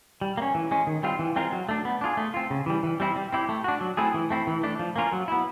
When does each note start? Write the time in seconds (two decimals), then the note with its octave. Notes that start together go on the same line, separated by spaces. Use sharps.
0.21 G3
0.37 A#3
0.42 C#4
0.55 E3
0.71 G#3 C#4
0.87 D#3
1.03 G3 C4 F4
1.19 E3
1.36 G#3 C4 F4 A#4
1.52 F#3
1.69 A3 D4
1.85 B3
2.01 D4 F4 G#4
2.17 A3
2.34 C4 F4
2.50 C#3
2.66 E3 G3
2.83 E3
3.00 G3 C4 E4
3.16 G3
3.33 C4 E4 G4
3.49 A3
3.64 D4 F#4
3.81 F#3
3.97 A3 C4 E4 G#4
4.14 E3
4.30 A3 C4 E4
4.47 E3
4.63 A3 D4
4.79 F3
4.96 A#3 C#4 F4 A#4
5.13 F#3
5.28 B3 E4